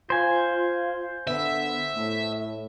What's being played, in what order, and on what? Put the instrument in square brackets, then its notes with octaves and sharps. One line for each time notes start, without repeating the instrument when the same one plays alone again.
[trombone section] F4 [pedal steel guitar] C5 G#5
[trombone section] D3 B3 [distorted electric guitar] E5
[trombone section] A2